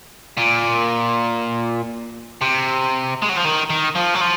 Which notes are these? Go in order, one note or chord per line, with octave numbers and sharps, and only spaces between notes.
A#2
C3
G#3
F#3
F3
D#3
D#3
F3
F#3
F3